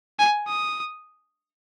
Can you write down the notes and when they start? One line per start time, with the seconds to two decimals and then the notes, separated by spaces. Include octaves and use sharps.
0.19 G#5
0.47 D#6